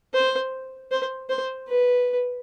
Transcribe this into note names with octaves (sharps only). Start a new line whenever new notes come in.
C5
C5
C5
B4